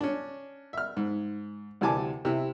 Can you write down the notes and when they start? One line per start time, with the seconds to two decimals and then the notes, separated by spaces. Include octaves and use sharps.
0.01 C#4 D4
0.73 E5 F6
0.97 G#2
1.81 D2 C3 E3 G#5 A5 D6
2.25 C3 E4